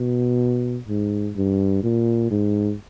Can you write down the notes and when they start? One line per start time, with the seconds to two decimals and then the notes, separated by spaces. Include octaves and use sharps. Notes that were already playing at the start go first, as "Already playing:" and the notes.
Already playing: B2
0.88 G#2
1.36 G2
1.83 A#2
2.31 G#2